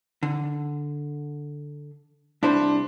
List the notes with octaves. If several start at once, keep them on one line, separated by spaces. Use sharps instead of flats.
D3
C2 D4 E4 C5